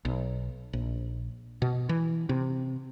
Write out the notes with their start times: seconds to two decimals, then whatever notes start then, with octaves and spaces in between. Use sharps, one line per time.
0.05 B1
0.73 A#1
1.62 B2
1.89 E3
2.29 C3